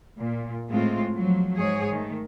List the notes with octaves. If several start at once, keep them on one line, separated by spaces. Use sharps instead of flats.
A#2
A2 G#3 A3 C4 F4
F3 F#3
G#2 G#4 C#5
D#3 A3